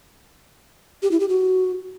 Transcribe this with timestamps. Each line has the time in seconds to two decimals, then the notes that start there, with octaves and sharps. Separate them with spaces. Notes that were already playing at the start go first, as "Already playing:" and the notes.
1.03 G4
1.11 E4
1.20 G4
1.29 F#4